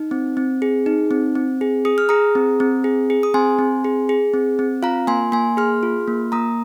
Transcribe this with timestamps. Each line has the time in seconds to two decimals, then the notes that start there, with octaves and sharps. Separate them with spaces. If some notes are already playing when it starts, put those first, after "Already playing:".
Already playing: D#4
0.11 C4
0.37 C4
0.62 G#4
0.86 D#4
1.11 C4
1.35 C4
1.61 G#4
1.85 G#4 D#6
1.98 F6
2.09 G#4 A#5 D#6
2.35 C4
2.60 C4
2.84 G#4
3.10 G#4
3.23 D#6
3.34 C4 G#5 C6
3.59 C4
3.84 G#4
4.09 G#4
4.34 C4
4.59 C4
4.83 F4 F5 A#5
5.07 A#3 G#5 C6
5.32 A#3 G#5 C6
5.57 G#4 C6 F6
5.83 F4
6.08 A#3
6.32 A#3 A#5 D#6